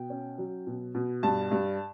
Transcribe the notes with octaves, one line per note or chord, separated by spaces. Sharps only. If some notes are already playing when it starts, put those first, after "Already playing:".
Already playing: B2 G5
C#4
F#3
B2
B2
G2 A5
G2